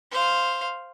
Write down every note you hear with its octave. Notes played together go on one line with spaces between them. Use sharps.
C5 F5